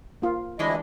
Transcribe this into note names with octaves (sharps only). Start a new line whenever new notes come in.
A#3 F4
D2 E3 G#3 D4 E4 D#5